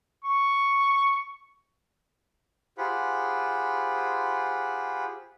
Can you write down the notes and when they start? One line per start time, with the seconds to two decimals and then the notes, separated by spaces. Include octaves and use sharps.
0.24 C#6
2.78 F4 G4 G#4 C5 F#5 B5